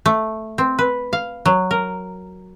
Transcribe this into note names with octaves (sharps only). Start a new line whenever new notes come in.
A3
C4
B4
F5
F#3
A#4